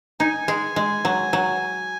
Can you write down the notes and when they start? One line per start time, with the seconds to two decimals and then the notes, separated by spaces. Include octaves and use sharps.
0.20 D#4 G#5
0.48 G#3
0.76 G#3
1.05 F#3
1.33 F#3